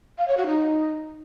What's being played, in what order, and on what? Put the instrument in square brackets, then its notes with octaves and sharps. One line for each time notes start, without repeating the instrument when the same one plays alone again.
[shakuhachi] F5
C#5
F#4
D#4